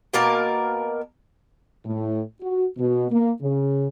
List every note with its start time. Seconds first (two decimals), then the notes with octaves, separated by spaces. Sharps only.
0.14 B2 A#3 A#4 A5
1.85 A2
2.41 F#4
2.78 B2
3.12 A#3
3.41 C#3